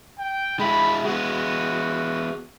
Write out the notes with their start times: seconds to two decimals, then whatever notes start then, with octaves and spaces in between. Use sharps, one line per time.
0.19 G5
0.60 G#3 E4 B5
1.05 G#3 B3 F#4